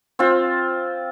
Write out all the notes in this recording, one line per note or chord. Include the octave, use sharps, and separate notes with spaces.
C4 F4